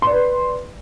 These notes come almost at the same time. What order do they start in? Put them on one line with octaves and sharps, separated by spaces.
C6 D5 B4